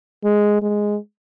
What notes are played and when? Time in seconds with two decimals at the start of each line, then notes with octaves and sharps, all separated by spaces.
0.24 G#3
0.62 G#3